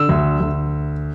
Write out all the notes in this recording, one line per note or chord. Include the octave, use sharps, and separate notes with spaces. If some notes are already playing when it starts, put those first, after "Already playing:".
Already playing: D3 E6
D2
D2